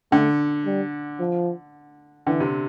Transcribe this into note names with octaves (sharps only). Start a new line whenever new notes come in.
D3 A3
G3
F3
D3 E3
C3